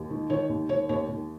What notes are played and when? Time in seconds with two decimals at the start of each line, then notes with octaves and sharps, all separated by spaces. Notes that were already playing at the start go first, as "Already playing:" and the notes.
Already playing: D#2
0.10 D#3
0.30 D#3 C#5
0.49 D#2
0.69 D#3 C#5
0.89 D#2 C#5
1.08 D#2